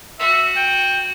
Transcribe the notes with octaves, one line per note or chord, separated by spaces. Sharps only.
F#4 E5
G5